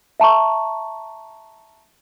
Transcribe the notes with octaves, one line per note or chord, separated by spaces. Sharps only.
E5 A5 A#5 C#6